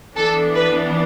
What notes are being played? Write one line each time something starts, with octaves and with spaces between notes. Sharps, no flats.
E3 B3 D4 A4
B4